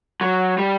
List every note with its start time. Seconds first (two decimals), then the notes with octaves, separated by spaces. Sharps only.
0.21 F#3
0.58 G3